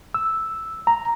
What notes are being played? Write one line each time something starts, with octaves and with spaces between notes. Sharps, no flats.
E6
A#5